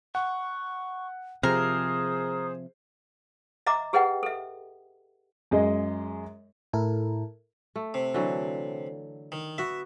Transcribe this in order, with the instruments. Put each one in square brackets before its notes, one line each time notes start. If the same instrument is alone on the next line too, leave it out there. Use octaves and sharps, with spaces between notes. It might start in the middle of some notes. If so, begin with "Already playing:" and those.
[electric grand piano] F#5 [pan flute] C#6
[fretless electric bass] C3 F3 [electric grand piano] G#4 C5 [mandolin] A#4 [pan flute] D#6
[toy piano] D#5 E5 A#5 D6
G4 G#4 B4 D#5 F#5 G5
A4 E5
[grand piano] F#2 G#3 G#4 D#5
[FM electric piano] A2 E4 A4 A#4
[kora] A3
[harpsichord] C3
[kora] D3 E3 F#3
[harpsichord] D#3
[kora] B3 F#4 [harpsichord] E5